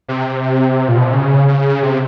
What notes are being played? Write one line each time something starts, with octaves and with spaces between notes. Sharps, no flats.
C3
A#2
B2
C3
C#3
C#3
C3